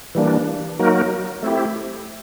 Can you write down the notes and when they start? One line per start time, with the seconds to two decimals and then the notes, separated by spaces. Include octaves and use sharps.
0.15 E3 G3 A#3 D4
0.79 F#3 A#3 D#4 F#4 A#4
1.43 A3 C4 E4 G4